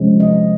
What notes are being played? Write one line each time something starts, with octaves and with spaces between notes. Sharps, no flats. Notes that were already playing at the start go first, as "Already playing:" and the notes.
Already playing: C3 F3 G#3 C#4
D#5